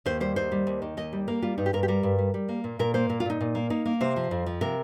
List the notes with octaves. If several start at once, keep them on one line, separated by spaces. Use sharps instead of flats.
D#2 C5
G3 C5
D#2 C5
G3
D#2
D#3
D#2 D#5
G3
A#3 A#4
G3 F4
G2 D#4
G4
G2 A#4
G4
G3 A#4
G2
G3
G3
A#3
A#2
A#2 A#4
A#3 C5
A#2 A#4
F4
A#2 D#4
A#2
A#3
A#3 D#4
A#3
C3 C5
F3
F2
F3
C3 A#4